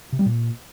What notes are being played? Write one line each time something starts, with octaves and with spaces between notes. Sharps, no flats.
C3
G3
A#2